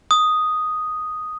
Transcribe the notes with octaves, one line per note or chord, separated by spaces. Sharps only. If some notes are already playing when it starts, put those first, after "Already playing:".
D#6